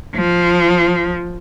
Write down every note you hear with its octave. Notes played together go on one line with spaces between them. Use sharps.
F3